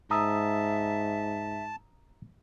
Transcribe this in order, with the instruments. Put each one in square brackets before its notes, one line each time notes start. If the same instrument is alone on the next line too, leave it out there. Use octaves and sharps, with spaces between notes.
[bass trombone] G#2 [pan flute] E5 [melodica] A5 [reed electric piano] A#5 D#6 E6